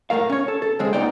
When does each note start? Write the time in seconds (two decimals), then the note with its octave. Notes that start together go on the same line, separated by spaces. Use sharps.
0.10 A2 C#3 A3 A#4 F5
0.29 C#4 C#5
0.48 A4
0.62 A4
0.79 D#2 C#3 G#3 C4
0.93 C#2 A#2 B3 D#4 D5 G5